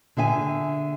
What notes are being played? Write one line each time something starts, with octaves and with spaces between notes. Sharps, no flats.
D3 G#4 E5 G#5